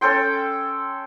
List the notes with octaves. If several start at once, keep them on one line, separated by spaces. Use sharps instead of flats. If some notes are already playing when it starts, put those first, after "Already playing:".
C#4 A4 G5 C6